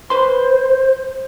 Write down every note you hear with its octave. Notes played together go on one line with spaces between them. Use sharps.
B4 C5 C6